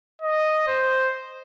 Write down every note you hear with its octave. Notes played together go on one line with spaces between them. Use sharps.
D#5
C5